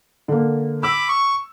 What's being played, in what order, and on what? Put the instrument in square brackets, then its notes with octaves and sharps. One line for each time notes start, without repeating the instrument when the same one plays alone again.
[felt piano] D3 A#3
[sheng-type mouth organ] B5 D6 [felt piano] E6
[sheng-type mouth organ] C#6